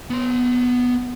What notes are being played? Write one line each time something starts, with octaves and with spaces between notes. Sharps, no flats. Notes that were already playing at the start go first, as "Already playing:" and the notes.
B3 C6